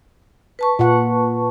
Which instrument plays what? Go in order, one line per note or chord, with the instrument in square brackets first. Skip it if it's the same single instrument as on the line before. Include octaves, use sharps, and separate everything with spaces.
[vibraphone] B4 A5 C#6
[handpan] A#2 F4 F#5